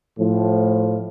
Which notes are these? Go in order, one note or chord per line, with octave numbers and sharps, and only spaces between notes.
A2 F3